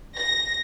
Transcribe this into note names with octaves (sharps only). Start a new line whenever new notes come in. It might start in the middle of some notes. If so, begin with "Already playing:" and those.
A#6